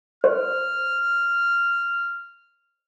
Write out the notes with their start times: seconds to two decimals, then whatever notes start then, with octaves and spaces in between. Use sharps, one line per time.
0.24 C5 F6